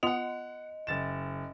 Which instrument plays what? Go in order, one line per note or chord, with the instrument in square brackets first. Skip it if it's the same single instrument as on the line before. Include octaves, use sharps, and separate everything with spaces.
[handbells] B3 F4 D#6 [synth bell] D#5 [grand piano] F#5 F7
[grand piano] F#1 A6 E7